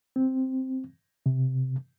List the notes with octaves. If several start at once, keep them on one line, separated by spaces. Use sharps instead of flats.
C4
C3